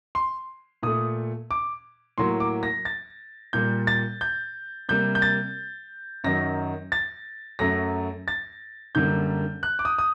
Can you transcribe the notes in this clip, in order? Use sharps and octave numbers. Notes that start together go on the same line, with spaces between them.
C6
A#2 A3 D#6
D6
A2 F#3 A#3 C6
D6
A#6
A6
A#2 G3 A#3 G6
A6
G6
C3 G3 A#3 G6
G6
A6
F#2 D#3 F#3 A#6
A6
F#2 F#3 A3 A#6
A6
F#2 D3 G3 A#3 G6
F#6
D6
D#6
D#6